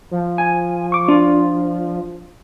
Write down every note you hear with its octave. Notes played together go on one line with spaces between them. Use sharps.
F3
G#5
C#6 D6
D4 F4